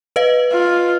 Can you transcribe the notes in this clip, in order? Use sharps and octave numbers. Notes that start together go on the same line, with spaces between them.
B4 D#5 F5
F4